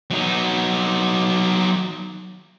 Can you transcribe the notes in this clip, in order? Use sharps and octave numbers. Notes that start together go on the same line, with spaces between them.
F#3 D#4